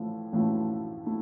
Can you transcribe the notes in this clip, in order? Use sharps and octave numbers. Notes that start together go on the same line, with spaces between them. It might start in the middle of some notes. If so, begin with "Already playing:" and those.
Already playing: A1 A2 F3 A3 E4
A1 A2 F3 A3 E4
A3 E4